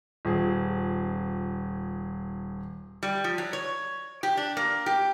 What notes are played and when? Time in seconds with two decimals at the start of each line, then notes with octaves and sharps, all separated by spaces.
0.25 D#1 G#4
3.03 G3
3.24 F3
3.38 F#3
3.53 C#5
4.23 G4
4.37 D4
4.57 A#3
4.86 G4